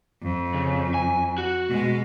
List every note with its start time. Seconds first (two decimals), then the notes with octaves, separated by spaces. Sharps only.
0.23 F2
0.54 C#3
0.94 G#5
1.38 F#4
1.70 B2 G#3